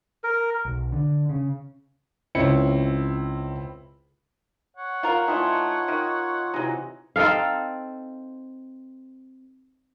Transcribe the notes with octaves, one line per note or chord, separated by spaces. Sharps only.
A#4
B1
D3
C#3
C#2 C4 E4 C#5 C#7
C#5 F#5
F4 A#4
E3 A3 D#4 F4
D#3
C3 E3 F#3 D#4
C4 D#4 A4 F5